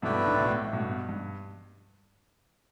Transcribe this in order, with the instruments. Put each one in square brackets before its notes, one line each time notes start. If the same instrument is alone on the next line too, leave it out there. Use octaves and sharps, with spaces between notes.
[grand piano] G2 B2 [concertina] A3 E4 B4 D5 G5
[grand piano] A2 D3
B2
A2
A2
G2 B2
G2